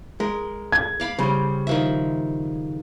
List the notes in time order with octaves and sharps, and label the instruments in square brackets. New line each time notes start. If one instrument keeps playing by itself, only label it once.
[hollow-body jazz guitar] G#3 [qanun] A#4
[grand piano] G#6
[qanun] D5 F5 B5
[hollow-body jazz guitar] C#3 G3 [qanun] C5
[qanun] D#3 F3 E5